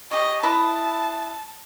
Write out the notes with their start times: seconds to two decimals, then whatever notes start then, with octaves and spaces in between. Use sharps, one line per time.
0.11 G4 C#5 D#5
0.43 E4 B4 D#5 A5